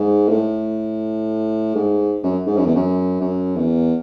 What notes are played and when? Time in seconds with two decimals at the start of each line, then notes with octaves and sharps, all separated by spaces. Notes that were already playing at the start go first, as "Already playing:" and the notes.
Already playing: G#2
0.29 A2
1.75 G#2
2.24 F#2
2.47 G#2
2.57 F#2
2.66 E2
2.76 F#2
3.21 F#2
3.56 E2